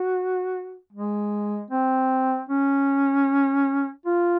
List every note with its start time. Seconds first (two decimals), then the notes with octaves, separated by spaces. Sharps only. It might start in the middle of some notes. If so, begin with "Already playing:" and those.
Already playing: F#4
0.93 G#3
1.71 C4
2.49 C#4
4.06 F4